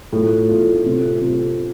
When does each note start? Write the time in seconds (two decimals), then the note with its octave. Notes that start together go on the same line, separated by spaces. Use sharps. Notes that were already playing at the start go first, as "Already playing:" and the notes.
0.13 A2 A3 F4
0.49 A2 A3 F4
0.86 C3 A3 F4
1.21 C3 A3 F4